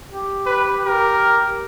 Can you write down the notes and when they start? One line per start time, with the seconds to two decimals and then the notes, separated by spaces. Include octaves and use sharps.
0.11 G4
0.46 B4
0.85 G4 A#4